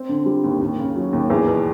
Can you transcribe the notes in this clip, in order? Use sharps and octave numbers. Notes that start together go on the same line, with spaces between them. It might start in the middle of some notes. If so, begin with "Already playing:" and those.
Already playing: C4
D3
G3
D#2
D#2
C#3
F#3
D#2
E2
B2